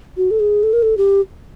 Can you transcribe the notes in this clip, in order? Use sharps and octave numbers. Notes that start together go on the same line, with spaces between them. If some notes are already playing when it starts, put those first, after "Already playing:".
F#4
A4
G#4
A4
A#4
A4
G4